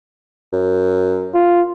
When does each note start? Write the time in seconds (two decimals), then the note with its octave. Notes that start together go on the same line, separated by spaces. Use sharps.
0.53 F#2
1.34 F4